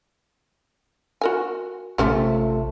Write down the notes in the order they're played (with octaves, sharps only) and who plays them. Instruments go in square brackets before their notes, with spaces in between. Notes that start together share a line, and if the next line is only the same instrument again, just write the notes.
[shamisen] F#4 A#4 G#5
[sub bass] A1 [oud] C3 A3 F4 [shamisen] C4 C#4 G4